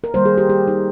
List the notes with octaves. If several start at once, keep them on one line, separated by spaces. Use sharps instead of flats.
A#4
D#3 G3 A#3 C5
G#4
G4
G4
D#4